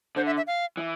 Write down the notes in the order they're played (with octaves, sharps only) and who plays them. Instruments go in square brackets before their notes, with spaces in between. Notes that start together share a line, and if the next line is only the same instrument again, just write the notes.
[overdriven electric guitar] D3 [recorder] C5
[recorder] E5
E5
F5
[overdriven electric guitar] E3